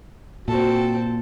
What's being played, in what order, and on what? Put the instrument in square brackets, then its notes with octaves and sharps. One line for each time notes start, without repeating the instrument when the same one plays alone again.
[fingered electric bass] A#2 [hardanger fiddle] C4 A4 [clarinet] F#4